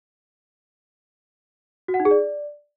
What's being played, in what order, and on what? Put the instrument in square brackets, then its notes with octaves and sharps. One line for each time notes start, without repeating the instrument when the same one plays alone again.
[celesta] F#4
F#5
D#4
G#4
D5